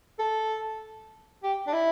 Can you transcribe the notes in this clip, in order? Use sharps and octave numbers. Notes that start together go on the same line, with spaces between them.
A4
G4
D4
E4